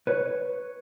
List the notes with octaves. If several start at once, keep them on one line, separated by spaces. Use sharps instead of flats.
B4 C#5